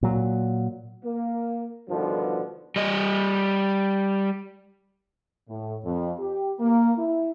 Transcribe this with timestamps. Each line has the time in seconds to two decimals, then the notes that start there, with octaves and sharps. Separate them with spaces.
0.03 A#2 F#3
1.04 A#3
1.89 G2 B2 D3 D#3 F3
2.76 G3 D#5
5.49 A2
5.85 F2
6.19 G4
6.59 A#3
6.97 E4